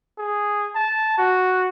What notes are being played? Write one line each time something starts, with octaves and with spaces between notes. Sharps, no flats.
G#4
A5
F#4